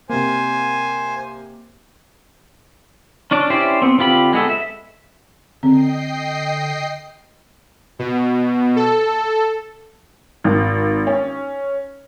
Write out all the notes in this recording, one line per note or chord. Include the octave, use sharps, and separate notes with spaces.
C3 A#3 C5 G#5
C#4 D4 D5
C#4 E4 G4 C5 D5
B3 C4
D3 C4 F4 G4 B5
G#3 B3 A4
E5
D3 C4 D#5 G5 C7
B2
A4
G#1
C#4